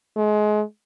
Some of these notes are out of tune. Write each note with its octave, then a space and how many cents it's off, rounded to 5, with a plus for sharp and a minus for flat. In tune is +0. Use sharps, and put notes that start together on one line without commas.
G#3 +30